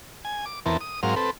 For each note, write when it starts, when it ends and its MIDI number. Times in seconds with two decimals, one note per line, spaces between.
0.25 0.45 80
0.46 0.60 86
0.66 0.77 40
0.66 0.77 52
0.66 0.77 59
0.66 0.77 60
0.66 0.77 70
0.66 0.77 81
0.81 1.00 87
1.03 1.15 44
1.03 1.15 54
1.03 1.15 60
1.03 1.15 70
1.03 1.15 77
1.16 1.31 60
1.16 1.31 69
1.16 1.31 71